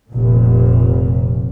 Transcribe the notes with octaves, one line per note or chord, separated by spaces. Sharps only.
F1 A#2